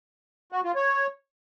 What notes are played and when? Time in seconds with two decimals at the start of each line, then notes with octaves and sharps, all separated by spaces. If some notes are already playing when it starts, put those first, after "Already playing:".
0.52 F#4
0.64 F4
0.76 C#5